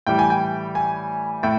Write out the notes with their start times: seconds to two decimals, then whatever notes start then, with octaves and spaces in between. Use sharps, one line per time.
0.07 A2 E3 G3 G5
0.19 G#5
0.30 G5
0.75 G#5
1.43 A2 G5